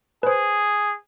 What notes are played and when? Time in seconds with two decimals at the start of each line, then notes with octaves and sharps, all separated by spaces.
0.23 G#4 B4 C5